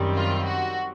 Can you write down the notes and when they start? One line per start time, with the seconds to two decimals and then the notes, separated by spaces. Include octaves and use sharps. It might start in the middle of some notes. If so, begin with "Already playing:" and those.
Already playing: F#2 D#3 G3 C4
0.16 F4
0.46 F#4